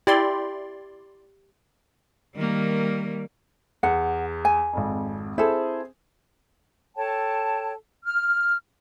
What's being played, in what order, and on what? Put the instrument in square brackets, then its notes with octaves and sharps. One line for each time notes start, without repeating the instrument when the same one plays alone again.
[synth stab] E4 D5 C6 [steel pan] G4
[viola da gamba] D#3 A#3 [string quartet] G3
[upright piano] E2 [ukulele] F#5
[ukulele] G#5
[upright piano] G#1 F2
[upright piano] C4 G#4 C5 [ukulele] E4 A4
[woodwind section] A4 C#5 G5 A5
F6